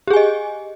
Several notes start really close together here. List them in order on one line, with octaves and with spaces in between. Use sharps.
G4 G#4 G#5 D#5